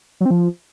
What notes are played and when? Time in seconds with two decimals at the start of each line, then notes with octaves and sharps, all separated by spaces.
0.21 F#3
0.26 C4
0.31 F3